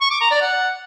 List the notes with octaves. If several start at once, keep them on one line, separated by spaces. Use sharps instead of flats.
C#6
D6
A#5
D5
F#5